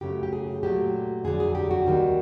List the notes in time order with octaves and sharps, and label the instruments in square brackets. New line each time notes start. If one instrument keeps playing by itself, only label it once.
[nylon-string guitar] F#2 C#3 F#3 A3 G4
G4
G#4
A#2 F#3 A3 G4
F2 D3 F#3 G#4
G#4
G4
F#4
D#2 D#3 G3